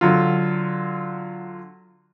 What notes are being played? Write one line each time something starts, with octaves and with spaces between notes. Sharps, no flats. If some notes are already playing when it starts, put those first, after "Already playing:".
D3 F#3 F4